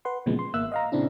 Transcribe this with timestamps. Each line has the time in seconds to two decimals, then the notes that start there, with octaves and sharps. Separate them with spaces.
0.05 B4 F#5 C6
0.26 A#2 C#3 E3 F3 G#3 B3
0.39 C6
0.54 G#1 A#3 E5 E6 F#6
0.72 D#5 F5 A#5
0.92 A#2 C#3 C4 D4 E4